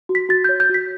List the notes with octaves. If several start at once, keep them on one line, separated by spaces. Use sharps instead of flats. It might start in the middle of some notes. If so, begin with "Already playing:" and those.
F#4
B6
F#4 A6
C#5 G6
G6
F#4 B6